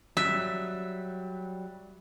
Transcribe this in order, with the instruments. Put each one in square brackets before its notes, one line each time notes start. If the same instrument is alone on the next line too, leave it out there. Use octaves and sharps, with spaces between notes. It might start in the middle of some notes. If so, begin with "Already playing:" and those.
[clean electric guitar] F#3 G3 [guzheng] E5